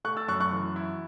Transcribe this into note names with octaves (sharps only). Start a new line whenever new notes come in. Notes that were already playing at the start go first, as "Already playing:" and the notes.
A3 C#6 F#6
E6 A6
F#2 C#6 F#6
C#6 F#6
E3
E4